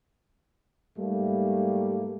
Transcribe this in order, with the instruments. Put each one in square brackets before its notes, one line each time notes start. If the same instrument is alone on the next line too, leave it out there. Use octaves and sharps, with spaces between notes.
[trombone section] G#2 G3 A3 A#3